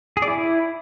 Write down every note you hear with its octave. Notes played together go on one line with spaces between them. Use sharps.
G#4
D5
E4